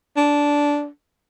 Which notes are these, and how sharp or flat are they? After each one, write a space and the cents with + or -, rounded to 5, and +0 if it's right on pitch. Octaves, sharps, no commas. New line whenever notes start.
D4 -10